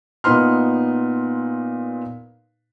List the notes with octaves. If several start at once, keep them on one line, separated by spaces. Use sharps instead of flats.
A#2 B3 D#4 B4 C6 F6